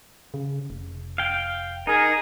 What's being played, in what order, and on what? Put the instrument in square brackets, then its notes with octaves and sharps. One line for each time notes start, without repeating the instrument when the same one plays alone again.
[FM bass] C#3
F1
[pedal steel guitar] F5 G5
[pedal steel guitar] D#4 [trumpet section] G#4 A#4